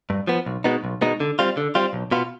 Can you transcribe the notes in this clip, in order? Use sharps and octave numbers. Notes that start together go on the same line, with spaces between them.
G2
F3 B3
B1
B2 G#3 B3 D#4
B1
B2 G#3 B3 D#4
D3
G3 C4 F4
D3
G3 C4 F4
B1
B2 B3 F4